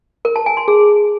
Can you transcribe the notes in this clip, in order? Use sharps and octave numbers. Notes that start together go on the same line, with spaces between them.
A#4
A5
G#5
C6
G#4